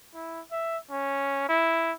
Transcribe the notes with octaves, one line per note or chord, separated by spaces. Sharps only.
E4
E5
C#4
E4